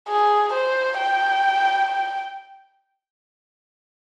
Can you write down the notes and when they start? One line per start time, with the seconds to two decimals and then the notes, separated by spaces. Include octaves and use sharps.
0.08 G#4
0.53 C5
0.98 G5